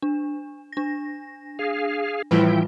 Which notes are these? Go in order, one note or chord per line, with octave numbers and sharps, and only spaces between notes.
D4
D4 A#6
G#4 F5
A2 E3 F3 G3 E4 F4 B4 G5